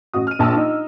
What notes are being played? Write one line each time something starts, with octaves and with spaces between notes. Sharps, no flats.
A1 F#4 D#6
F6 D#7
A#1 A5 D#6 E6
D#4